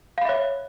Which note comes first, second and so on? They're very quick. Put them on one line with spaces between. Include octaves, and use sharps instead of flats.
F5 B5 E5 C#5